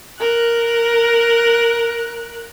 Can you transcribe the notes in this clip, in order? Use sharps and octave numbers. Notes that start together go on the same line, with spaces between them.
A#4 F#6